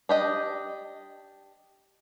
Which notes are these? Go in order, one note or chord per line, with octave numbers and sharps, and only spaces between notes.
D4 G4 D#5